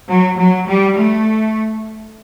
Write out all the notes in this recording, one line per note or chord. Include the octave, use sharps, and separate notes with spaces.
F#3
F#3
G3
A3